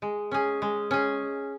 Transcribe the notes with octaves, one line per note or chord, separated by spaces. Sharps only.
G#3
C#4 G#4
G#3
C#4 G#4